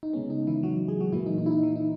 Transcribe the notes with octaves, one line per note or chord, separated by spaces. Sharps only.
D#4
C#3 G#3 B3 C#4
D#4
E3 E4
F#3 F#4
G#3 G#4
F#3 F#4
A#2 E3 A#3 E4
D#4
D#4
E4
D#4
E3 E4
D#4